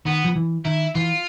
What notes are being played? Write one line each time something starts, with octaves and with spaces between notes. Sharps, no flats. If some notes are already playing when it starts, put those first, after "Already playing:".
D#3 B3
F3
E3
D#3 E4
E3 F4